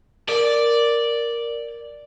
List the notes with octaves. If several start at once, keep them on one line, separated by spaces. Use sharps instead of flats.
A#4 D5